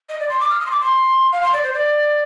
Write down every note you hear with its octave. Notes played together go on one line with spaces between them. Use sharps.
D#5
D5
C6
D6
F6
D#6
C6
D6
C6
F5
C6
D5
C5
D5